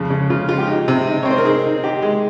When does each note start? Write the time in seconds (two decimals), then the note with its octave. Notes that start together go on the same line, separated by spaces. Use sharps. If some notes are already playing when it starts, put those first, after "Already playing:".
Already playing: F2 C#3
0.10 C#3
0.30 C#3 F4
0.48 G#3 F4
0.58 G4
0.68 D#4
0.88 C3
1.07 D#4
1.23 C#5
1.25 C4
1.30 C5
1.38 A#4
1.45 D#4 G#4
1.64 D#4
1.83 D#4 G4
2.02 G#3